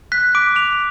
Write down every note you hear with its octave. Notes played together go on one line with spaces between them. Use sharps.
F#6 B6
D6 D7
D6 F7